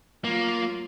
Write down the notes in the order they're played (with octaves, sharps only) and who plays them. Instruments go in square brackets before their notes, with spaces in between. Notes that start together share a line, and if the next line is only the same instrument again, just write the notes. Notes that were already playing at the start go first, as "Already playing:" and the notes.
[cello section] F#3 F4 [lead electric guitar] A#3